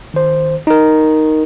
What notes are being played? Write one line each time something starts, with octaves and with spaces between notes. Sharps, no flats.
D#3 C5
D#4 A#4